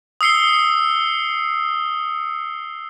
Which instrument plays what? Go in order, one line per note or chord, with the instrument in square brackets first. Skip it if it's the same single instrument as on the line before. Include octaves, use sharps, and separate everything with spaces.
[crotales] D#6 E6 C7 C#7 G7